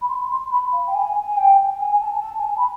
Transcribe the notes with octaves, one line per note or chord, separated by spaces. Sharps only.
B5
C6
C6
B5
F5
G5
G#5
G#5
G5
G#5
G#5
A5
A5
G#5
A5
B5